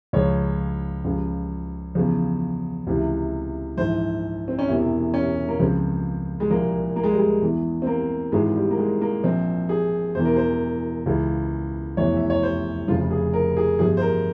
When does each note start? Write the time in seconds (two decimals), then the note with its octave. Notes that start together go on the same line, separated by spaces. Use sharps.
0.13 C#2 C#3 F3 C#5
1.05 C#2 C#3 F3
1.95 E2 C#3 F3
2.87 C#2 C3 E3
3.77 A#1 G#2 E3 C5
4.48 C4
4.59 C#4
4.68 E1 E2 C3 E3 E4
5.14 C#4
5.48 A#3
5.59 C#2 C#3 F3 C4
6.40 G#3
6.50 C2 A#2 F3 A#3
6.96 A#3
7.04 G#3
7.12 G3
7.19 G#3
7.42 E2 E3
7.82 C4
7.87 A#3
8.32 G#1 G#2 E3 G#3
8.56 G3
8.71 A#3
8.78 G#3
9.01 A#3
9.24 A#1 A#2 F3 C4
9.69 G#4
10.15 E1 E2 E3 C5
10.25 A#4
10.36 C5
11.06 C#2 C#3 E3
11.97 F1 E2 E3 C#5
12.17 E5
12.30 C#5
12.43 C5
12.88 F1 F2 C#3 F3 F4
13.10 G#4
13.33 A#4
13.57 G#4
13.79 G1 G2 F3 G#4
13.97 C5
14.01 A#4